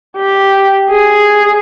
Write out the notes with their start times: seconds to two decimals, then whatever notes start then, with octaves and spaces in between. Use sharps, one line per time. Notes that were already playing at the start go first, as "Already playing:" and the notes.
0.17 G4
0.90 G#4